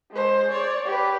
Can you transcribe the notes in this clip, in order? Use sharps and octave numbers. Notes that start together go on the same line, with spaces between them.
G#3 C5
C#5 D5
G4 B4